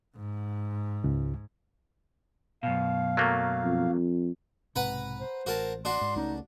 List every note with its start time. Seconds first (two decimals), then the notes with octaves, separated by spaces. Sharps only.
0.16 G#2
1.04 C#2
2.63 F#2 B2 F5
3.17 F#3 A3 A#3
3.64 F2
4.76 B1 G#2 C3 B4 F#5 A#5
5.20 C5
5.46 A1 F#4 A#4 A5
5.85 D4 F#4 C6
6.01 G#2
6.16 C#2 A3 C#4 D#4